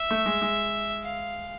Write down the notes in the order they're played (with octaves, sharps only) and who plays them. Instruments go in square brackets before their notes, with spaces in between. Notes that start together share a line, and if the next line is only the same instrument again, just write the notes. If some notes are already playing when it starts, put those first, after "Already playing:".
Already playing: [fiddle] E5
[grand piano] A3
G#3
G#3
[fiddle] F5